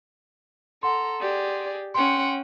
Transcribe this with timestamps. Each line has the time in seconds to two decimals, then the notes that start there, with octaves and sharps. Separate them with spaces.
0.83 A4 F#5 A#5 C6
1.21 G4 G#4 D5
1.94 C#4 F#5 G5 C6